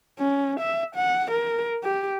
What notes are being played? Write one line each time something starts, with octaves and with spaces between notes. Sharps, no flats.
C#4
E5
F#5
A#4
G4